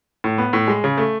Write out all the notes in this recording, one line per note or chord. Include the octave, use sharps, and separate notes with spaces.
A2
B3
A2
G#3
C#3
A3